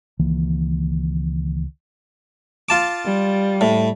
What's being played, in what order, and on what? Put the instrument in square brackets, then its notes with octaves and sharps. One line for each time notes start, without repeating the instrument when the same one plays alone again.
[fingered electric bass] C#2 D#3 E3 A#3
[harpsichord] F4 A5 D6
[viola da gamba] G3
[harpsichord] A2